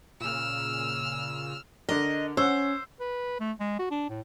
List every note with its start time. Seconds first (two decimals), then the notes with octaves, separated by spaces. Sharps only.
0.21 A#2 C#3 E6 F6
1.89 D3 D4 A#4 D#5
2.37 C#4 C5 C#5 F#5 E6
3.00 B4
3.40 A3
3.60 G#3
3.79 F#4
3.91 D4
4.10 A2